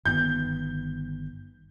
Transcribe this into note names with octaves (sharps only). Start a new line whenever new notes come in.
G1 D#3 B3 G6